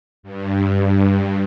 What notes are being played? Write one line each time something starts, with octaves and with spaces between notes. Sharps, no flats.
G2